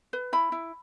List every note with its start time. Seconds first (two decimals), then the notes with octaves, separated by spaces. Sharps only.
0.13 B4
0.33 E4 B5
0.52 E4